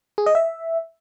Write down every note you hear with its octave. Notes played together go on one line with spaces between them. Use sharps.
G#4
D#5
E5